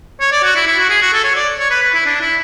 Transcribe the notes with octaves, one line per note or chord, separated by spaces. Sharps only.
C#5
D5
F#4
E4
E4
F#4
G#4
F#4
A4
C#5
D5
C#5
B4
B4
E4
D4
E4